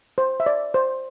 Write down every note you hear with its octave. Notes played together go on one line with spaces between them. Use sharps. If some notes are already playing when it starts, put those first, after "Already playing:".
C5
E5
D5
C5